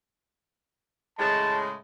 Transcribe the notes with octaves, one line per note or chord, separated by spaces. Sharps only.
A2 C#3 G#3 A5